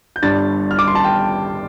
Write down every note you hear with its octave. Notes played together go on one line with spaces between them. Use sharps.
G6
G1 G2 G3 D4 A6
F6
D6
C6
A5
G5